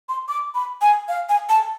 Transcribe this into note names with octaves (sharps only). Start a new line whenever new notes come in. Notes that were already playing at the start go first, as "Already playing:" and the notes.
C6
D6
B5
G#5
F5
G#5
A5